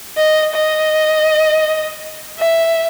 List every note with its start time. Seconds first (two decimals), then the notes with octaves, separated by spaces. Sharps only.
0.18 D#5
0.54 D#5
2.39 E5